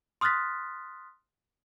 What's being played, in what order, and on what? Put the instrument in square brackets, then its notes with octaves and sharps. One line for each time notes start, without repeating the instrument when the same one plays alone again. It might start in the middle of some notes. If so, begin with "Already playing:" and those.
[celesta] C6 D#6 F6 F#6 A6 B6